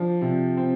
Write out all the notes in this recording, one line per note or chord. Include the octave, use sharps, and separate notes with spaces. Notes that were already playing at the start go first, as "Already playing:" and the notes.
Already playing: F3 D4
C3
C4